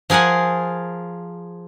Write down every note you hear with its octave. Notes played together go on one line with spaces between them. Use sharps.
F3 G#4 A#4 F#5 G#5